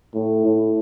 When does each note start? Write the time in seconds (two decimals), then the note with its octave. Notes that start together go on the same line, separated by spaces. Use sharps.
0.14 A2
0.45 A2